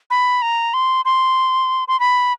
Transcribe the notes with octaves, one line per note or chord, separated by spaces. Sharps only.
B5
A#5
C6
C6
C6
B5